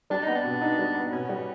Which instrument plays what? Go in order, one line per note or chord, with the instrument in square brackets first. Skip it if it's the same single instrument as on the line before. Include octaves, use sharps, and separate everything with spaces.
[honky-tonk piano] G3 [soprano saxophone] D4
[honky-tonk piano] B3 [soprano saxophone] D#4
[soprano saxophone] D4
[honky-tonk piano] B2
D#4
G3
B3
[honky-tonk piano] B2 [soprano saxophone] C#4
[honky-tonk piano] G3